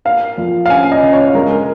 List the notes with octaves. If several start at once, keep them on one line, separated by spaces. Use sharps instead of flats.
A#3 F5
F2
F5
C#4 G#5
D#5
C#3
C#5
G#3 A#4
A#4